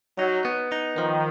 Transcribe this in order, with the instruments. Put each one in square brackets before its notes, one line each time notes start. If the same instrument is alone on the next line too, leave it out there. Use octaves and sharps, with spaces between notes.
[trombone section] F#3 [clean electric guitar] D#4
[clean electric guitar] B3
D#4
[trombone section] D#3 [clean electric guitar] F3